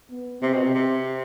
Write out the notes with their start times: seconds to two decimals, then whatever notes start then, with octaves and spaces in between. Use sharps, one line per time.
0.11 B3
0.42 C3 C4
0.53 B2
0.63 C3
0.74 C3